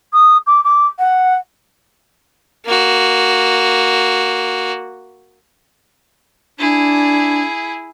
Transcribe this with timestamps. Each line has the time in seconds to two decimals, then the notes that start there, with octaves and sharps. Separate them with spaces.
0.13 D#6
0.47 D6
0.64 D6
0.99 F#5
2.65 A#3 F#4
6.59 D4 E4 G#4